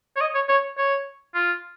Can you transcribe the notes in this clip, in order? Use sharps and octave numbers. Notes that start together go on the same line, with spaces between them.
C#5
D#5
C#5
C#5
C#5
F4